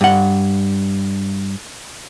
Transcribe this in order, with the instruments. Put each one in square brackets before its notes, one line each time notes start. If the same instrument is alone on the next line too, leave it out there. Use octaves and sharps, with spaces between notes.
[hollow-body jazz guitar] G2 F#5